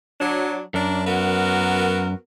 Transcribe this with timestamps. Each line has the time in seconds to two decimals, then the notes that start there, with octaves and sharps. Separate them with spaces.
0.20 F#3 D4
0.74 F#2 D4 A#4
1.06 B3 F#4 A#4